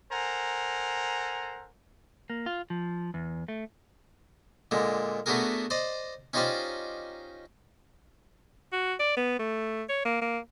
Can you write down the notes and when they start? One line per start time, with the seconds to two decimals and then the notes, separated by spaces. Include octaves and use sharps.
0.12 A4 A#4 C5 F#5 G#5 A#5
2.30 A#3
2.46 F4
2.70 F3
3.14 E2
3.48 A3
4.71 A#2 D3 G#3
5.26 A3 B3 D4 F#4 G#4 A#4
5.70 C5 D5 D#5
6.33 C#4 D#4 F4 G4 C5 D5
8.72 F#4
9.00 D5
9.17 B3
9.39 A3
9.89 C#5
10.05 A#3
10.21 A#3